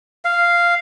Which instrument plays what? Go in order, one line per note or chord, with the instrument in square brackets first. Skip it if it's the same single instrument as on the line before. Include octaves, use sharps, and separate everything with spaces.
[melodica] F5